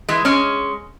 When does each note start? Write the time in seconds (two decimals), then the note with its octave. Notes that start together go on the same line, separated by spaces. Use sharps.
0.09 E3 G#3
0.25 G#3 C#4